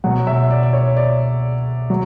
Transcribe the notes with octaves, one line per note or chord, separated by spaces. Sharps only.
B2 F#3 F#5
E5
D5
D5
C#5
D5
F#3